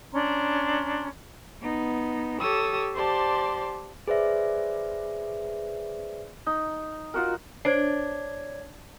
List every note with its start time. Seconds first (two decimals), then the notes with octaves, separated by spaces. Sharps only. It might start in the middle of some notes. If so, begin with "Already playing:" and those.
0.12 C#4 D4 A#5 C6
1.61 B3 D#4
2.39 G4 A4 C#5 D#6 E6
2.95 G4 C5 D5 A5 C6
4.08 G#4 B4 C5 D5 E5
6.47 D#4
7.14 F4 F#4 A#4
7.65 D4 C5 C#5 G#6 C7